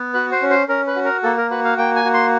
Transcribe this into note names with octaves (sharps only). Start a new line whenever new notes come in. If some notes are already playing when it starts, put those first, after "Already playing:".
Already playing: B3
F#4 B4
C5
C#4
C5
C#4 A#4
B4
F#4
A#4
A#3 A4
A#4
F#4 B4
F5
A#3 G5
G#5
F#4
C6